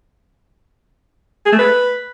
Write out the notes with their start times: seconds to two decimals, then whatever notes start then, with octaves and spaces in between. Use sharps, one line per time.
1.46 G#4
1.52 A3
1.59 B4